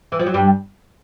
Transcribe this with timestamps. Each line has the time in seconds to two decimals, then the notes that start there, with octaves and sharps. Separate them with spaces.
0.12 E3
0.19 F3
0.26 F#3
0.34 G2 G3